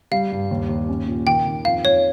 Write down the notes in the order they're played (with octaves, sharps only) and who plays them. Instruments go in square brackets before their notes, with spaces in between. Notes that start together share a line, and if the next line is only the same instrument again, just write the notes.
[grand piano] G3 [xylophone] F5
[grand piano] G2
D#2
D#2
C#4
A#2
[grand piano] D#3 [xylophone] G5
[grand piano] D#3
[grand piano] F2 [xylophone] F5
[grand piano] F2 [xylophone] C#5